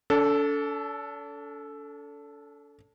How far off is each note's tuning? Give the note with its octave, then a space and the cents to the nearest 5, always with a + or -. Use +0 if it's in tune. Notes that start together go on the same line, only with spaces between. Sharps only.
D4 -45 A4 +0